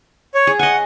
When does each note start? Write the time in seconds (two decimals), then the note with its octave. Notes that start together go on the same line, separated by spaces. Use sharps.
0.34 C#5
0.47 G#4
0.59 D#5 F#5 G#5